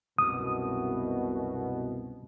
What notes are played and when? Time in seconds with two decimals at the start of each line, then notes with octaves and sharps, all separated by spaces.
0.18 C2 F#2 B2 D#6